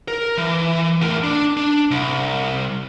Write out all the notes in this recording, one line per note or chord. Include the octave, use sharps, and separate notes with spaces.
A#4
E3
A2 A#4
D4
D4
C2